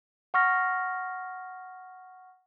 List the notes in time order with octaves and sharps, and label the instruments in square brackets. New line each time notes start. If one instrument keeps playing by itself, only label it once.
[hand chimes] F#5 C#6 F6 A#6